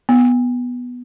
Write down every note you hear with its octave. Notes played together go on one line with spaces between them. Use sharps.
B3